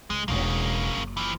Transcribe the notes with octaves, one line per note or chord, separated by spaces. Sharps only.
C#2 G#3
E1 C#3 A#3 D4
F#1
E3 F3